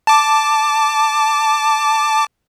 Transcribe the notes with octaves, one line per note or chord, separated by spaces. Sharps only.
A5 D6